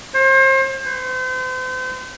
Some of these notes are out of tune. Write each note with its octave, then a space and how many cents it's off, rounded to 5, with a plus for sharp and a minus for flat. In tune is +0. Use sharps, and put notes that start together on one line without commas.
C5 +35
C5 -40